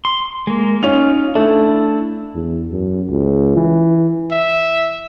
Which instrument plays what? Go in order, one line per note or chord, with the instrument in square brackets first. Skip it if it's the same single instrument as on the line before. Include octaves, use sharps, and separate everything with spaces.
[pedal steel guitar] C6
G#3 A#3
[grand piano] C#4 F7 [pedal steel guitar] D#4 F4
[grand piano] A3 [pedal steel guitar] D4 E4
[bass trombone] E2
F#2
C#2
E3
[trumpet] E5